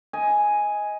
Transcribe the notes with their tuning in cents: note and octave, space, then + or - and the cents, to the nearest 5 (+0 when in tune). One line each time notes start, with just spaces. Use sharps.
D#5 +15 G#5 +0